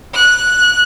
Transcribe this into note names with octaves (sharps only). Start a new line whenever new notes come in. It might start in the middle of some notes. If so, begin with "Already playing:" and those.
F#6